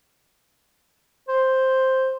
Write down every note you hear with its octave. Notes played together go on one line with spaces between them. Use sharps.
C5